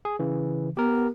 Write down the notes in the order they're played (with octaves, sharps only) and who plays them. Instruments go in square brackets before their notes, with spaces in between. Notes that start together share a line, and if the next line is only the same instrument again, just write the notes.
[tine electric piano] G#4
C#3 E3
[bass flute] B3 [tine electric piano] G4 A#4